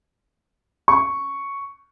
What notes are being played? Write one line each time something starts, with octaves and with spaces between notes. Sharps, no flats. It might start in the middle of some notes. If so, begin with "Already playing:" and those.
C#6